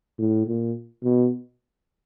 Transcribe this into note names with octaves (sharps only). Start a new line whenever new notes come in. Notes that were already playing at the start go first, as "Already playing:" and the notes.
A2
A#2
B2